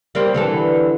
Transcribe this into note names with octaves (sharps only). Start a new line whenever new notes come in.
G3 A#3 C4
D3 E3 A4